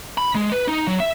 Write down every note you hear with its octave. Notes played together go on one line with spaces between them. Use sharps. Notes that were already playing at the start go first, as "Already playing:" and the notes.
B5
G#3
B4
D#4
F#3
E5